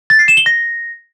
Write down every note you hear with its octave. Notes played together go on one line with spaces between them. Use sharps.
A6
C7
E7
G7
A#6